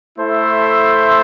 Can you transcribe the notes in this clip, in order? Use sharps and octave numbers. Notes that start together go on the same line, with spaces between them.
A3 E4 A4 C5 E5